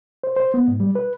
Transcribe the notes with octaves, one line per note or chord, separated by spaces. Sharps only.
C5
C5
B3
G#2
G3
B4